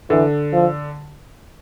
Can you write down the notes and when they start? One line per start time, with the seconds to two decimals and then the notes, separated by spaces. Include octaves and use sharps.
0.10 D3 E3
0.53 F3